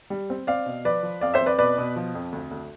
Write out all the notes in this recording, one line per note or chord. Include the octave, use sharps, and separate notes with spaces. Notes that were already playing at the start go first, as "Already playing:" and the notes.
G3
C4
C4 D5 F5
B2
F3 B4 D5
F3
F2 D5 F5
C5 E5
F2
B4 D5
B2 B4 D5
B2
F3
F2
D2
D2